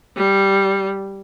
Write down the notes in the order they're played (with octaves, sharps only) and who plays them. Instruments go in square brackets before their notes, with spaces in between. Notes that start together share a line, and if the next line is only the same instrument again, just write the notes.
[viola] G3